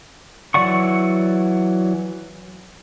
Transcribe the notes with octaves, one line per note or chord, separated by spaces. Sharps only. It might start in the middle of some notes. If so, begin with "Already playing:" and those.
E3 F#3 D5 F#5 C#6